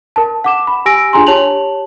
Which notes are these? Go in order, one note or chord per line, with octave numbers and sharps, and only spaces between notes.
A#4 A5
F#5 D6 E7
B5
G4 G#5 E6 A#6 D7
D4 F4 G#4 G#5 A#5 C6
G4 C#5 A5 F7 F#7